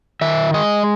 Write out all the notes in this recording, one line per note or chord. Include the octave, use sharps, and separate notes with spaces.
D#3 E5
G#3 D#5